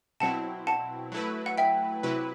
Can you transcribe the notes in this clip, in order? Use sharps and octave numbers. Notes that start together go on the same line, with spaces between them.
B2 F#3 C4 E4 F#5 A5
F#5 A5
F#3 A3 E4 B4
F#5
E5 G5
C3 F#3 E4 B4